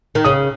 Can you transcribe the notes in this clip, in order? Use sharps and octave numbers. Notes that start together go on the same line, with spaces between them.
D#3
C#3 D#6